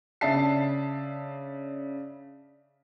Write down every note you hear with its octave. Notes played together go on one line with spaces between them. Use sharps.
C#3 D4 E5 A5 C7